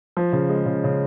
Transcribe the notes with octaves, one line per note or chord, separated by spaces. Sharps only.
F3
C#3
G#3
C#3
C#3